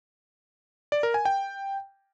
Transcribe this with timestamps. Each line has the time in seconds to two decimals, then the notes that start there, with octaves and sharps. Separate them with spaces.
0.92 D5
1.03 A#4
1.14 G#5
1.25 G5